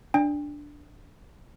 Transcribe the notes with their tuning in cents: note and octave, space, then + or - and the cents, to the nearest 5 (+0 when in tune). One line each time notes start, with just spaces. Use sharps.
D4 +0 G5 +40